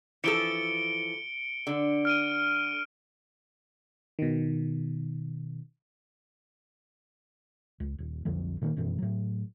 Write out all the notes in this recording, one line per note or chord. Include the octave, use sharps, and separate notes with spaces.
E3 F3 A4 C#7 D7 G7
D3
F6 D7 D#7
B2 D#3
C#2
D#1
B1 F2 D3 F3
A#2 D#3 E3 A#3
F1 F#2 B2 E3
A2 F#3